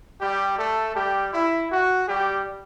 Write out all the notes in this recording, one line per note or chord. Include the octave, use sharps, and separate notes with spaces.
G3 G4
A3 A4
G3 G4
E4
F#4
G3 G4